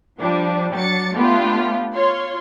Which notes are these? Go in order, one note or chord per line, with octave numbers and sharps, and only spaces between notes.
F3 G3 D4
F#3 D4 A6 C#7
A3 B3 D4 F4 G4
F4 C#5 C6